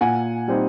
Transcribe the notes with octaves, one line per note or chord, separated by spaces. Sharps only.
A#2 F#5 G#5
G3 C4 D#4